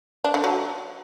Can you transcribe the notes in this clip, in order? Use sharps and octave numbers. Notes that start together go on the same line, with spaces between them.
D4
D3
F#3